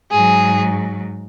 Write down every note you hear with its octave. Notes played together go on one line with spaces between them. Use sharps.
G#2 F#3 G#4